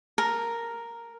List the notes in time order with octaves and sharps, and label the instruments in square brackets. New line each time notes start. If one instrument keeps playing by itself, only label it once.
[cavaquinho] A#4